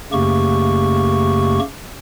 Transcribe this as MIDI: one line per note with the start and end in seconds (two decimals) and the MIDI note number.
0.13 1.59 42
0.13 1.59 49
0.13 1.59 57
0.13 1.59 58
0.13 1.59 67
0.13 1.59 85